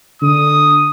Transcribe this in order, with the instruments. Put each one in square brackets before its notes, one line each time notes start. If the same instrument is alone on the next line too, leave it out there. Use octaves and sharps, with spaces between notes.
[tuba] D3 [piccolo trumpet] D#6